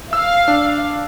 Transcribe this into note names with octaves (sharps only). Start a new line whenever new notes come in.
F5 E6
D4